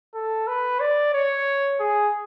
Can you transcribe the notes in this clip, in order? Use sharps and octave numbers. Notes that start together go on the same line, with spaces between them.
A4
B4
D5
C#5
G#4